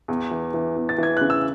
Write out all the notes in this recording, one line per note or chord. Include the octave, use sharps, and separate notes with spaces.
E2
E3
E3
E2
A6
E3 G#6
C#3 F#6
E6